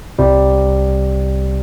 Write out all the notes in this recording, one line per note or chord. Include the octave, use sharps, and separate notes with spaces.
C2 C3 G3